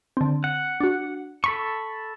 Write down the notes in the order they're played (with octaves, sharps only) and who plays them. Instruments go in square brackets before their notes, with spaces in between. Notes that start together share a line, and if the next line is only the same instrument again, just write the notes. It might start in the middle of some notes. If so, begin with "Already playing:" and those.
[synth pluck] D3 C4
[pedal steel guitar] F#5
[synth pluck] D4 F#4
[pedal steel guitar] A4 B5 C#6